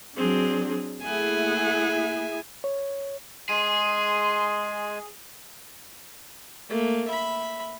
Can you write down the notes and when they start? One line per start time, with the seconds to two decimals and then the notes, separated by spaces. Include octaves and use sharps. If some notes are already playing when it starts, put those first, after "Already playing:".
0.17 F#3 C4 D4 G#4
1.03 A3 A#3 E4 G#4 E5 F#5 G#5
2.64 C#5
3.49 G#3 G#4 G#5 C6
6.69 A3 A#3
7.07 E5 B5